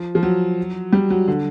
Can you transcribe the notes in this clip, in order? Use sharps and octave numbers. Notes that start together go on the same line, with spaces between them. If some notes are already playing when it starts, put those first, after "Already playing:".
Already playing: F3
F3
F#3
G3
F#3
D3